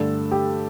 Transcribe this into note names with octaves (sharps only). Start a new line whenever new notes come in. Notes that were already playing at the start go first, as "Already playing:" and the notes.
Already playing: G2 D3 A3 D4 A4
G4